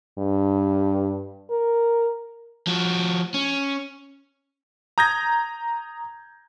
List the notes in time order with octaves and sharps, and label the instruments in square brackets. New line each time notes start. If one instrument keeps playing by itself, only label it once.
[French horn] G2
A#4
[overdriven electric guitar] F3 F#4
C#4
[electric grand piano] A#5 D#6 G6 G#6 A#6